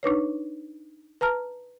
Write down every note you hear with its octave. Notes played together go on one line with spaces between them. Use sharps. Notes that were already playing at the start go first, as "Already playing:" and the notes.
D4 D#4 B4 C#5
B4 A5 A#5 F6